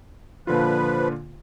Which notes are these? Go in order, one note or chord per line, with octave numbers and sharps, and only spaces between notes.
A#2 D3 F3 F4 B4